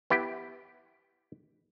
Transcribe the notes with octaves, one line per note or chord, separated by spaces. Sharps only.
B3 E4 G4 G5